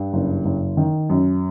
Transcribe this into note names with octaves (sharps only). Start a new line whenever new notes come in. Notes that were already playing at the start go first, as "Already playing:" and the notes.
Already playing: G2
F#1
F#1
D#3
F#2